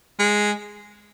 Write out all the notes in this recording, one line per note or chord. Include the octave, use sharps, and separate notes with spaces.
G#3